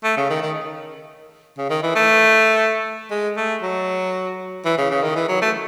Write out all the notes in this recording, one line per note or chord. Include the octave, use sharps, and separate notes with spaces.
A3
C#3
D#3
D#3
C#3
D#3
E3
A3
G#3
A3
F#3
E3
C#3
C#3
D#3
E3
F#3
A3